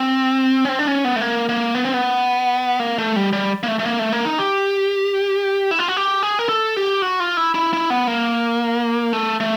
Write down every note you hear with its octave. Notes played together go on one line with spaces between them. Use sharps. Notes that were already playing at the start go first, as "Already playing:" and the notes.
Already playing: C4
C#4
C4
D4
C#4
B3
A3
A#3
A#3
B3
C4
B3
A#3
A3
G3
G3
A#3
A3
A3
A#3
A3
A#3
D#4
G4
E4
F4
F#4
G4
G#4
A#4
A4
G4
F#4
F4
E4
E4
E4
B3
A#3
A3
A3